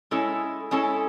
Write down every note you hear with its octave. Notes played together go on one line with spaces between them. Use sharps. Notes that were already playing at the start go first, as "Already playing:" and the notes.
G#3 C#4 E4 A4
G#3 C#4 E4 A4